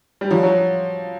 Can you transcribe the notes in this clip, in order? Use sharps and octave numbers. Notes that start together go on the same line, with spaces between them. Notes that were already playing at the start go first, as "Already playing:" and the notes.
G3
F3 F#3
F#3